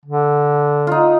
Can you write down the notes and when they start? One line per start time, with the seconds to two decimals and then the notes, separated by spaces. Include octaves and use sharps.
0.05 D3
0.87 D#4 F4